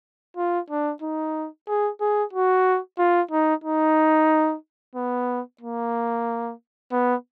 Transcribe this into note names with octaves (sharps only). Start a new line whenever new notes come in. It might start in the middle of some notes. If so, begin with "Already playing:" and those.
F4
D4
D#4
G#4
G#4
F#4
F4
D#4
D#4
B3
A#3
B3